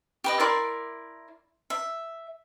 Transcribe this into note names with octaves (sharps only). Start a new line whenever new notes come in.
G4 B4 D#5
E4 A#4 D5 C6
E5